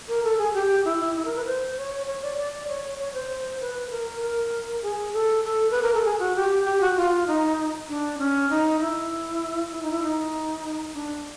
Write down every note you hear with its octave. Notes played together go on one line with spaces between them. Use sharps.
A#4
A4
G#4
G4
E4
E4
E4
A#4
B4
C5
C#5
C#5
D5
D5
C#5
C#5
C5
B4
A#4
A#4
G#4
A4
A4
B4
A#4
A4
G#4
F#4
G4
G4
F#4
F4
D#4
D4
C#4
D#4
E4
E4
D#4
E4
D#4
D4